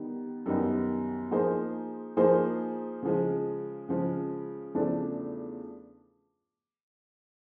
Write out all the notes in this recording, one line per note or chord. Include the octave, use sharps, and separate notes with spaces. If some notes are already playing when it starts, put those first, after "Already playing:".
Already playing: D#3 G3 B3 D#4
F#2 D#3 G3 B3 D#4
F3 A#3 D#4 G#4 C5
F3 A#3 D#4 G#4 C5
C#3 F3 G#3
C#3 F3 G#3
E2 C#3 F3 A3 D4